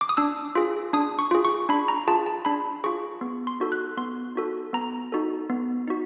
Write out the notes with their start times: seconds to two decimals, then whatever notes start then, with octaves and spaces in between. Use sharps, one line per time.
0.01 D6
0.09 D#6
0.17 D4 E6
0.55 F4 G#4
0.93 D4 D#6
1.19 C#6
1.31 F4 G#4
1.45 C#6
1.69 D4 B5
1.88 A#5
2.08 F4 G#4 A5
2.26 A5
2.45 D4 B5
2.84 F4 G#4 C#6
3.21 B3
3.47 C6
3.60 D#4 F#4 A4
3.72 F#6
3.97 B3 C6
4.35 D#4 F#4 A4
4.73 B3 A#5
5.12 D#4 F#4 A4
5.50 B3
5.88 D#4 F#4